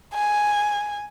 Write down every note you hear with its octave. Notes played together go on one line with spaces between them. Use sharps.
G#5